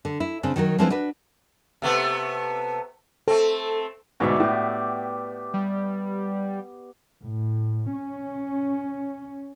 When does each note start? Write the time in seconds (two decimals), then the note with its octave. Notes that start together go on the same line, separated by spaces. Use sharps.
0.05 D3
0.20 E4
0.43 C#3 C4 D4
0.56 D#3 F#3 F#4 A#4
0.78 F3 G#3 C4 D4 E4 B4
0.90 D4 F#4 B4
1.82 C3 A3 B3
3.28 A3 C4 A4
4.20 D2 G#2 B2 F#4 D5 E5
4.40 A2 B3 G4
5.54 G3
7.23 A2
7.92 C#4